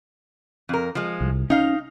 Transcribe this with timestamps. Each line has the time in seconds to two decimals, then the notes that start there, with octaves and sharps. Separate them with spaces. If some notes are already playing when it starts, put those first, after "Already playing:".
0.69 F2 A#4
0.95 F3 G#3
1.21 C2
1.50 C#4 D#4 F5